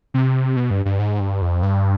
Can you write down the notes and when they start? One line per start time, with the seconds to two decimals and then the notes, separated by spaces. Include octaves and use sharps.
0.14 C3
0.56 B2
0.71 G2
0.85 G2
0.99 G#2
1.20 G2
1.42 F2
1.63 G2